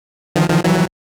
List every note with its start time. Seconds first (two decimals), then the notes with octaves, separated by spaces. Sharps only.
0.36 D#3 F3
0.49 D#3 F3
0.64 E3 F#3